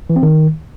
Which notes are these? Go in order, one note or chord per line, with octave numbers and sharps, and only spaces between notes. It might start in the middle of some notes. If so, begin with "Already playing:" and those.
E3
C4
D#3